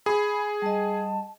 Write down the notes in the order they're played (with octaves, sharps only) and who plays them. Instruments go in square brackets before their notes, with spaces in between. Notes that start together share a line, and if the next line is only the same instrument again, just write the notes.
[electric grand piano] G#4 [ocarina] B5
[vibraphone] G3 D#5 [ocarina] A5